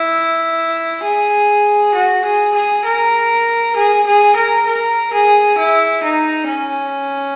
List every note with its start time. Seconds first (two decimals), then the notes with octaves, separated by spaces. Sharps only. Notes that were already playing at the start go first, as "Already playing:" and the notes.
Already playing: E4
1.03 G#4
1.95 F#4
2.25 G#4
2.55 G#4
2.85 A#4
3.76 G#4
4.07 G#4
4.36 A#4
4.67 A#4
5.13 G#4
5.58 E4
6.03 D#4
6.48 C#4